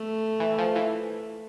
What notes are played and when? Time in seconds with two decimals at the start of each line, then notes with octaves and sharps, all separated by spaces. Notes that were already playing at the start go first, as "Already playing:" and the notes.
Already playing: A3
0.40 E3
0.58 F3
0.76 E3